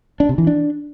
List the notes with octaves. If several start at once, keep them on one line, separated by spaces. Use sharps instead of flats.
D4
C3
E3
D4